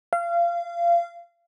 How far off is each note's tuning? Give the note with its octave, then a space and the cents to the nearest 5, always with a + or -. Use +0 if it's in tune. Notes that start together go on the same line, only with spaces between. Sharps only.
F5 -25